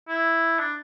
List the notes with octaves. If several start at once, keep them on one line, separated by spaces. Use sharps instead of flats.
E4
D4